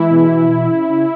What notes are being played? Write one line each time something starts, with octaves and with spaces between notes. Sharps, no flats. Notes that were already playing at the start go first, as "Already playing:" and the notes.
Already playing: E3 G#3 E4
B2
B2
E3
C#3
C#3